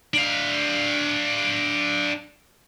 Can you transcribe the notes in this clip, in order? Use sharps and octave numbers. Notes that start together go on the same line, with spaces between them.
D4 F5